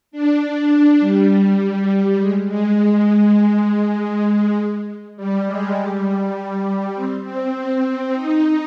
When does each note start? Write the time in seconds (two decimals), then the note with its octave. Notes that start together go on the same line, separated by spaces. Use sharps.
0.11 D4
1.00 G3
2.19 G#3
2.48 G#3
2.78 G#3
5.16 G3
5.46 G#3
5.76 G3
6.95 C4
7.24 C4
7.54 C4
8.13 D#4